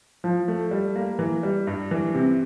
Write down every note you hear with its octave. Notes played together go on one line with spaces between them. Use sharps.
F3
A3
G3
A#3
E3
G3
G2
E3
C3